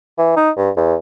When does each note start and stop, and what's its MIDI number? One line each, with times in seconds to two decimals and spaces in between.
0.18 0.35 52
0.36 0.50 63
0.56 0.70 43
0.77 0.95 40